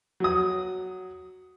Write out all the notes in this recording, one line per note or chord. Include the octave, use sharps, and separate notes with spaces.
F#3 D#6